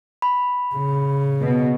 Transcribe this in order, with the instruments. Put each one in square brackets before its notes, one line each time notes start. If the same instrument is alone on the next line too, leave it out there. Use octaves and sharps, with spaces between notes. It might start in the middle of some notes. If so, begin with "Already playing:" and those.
[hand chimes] B5
[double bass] C#3
[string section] B2